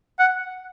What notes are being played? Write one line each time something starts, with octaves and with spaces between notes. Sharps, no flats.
F#5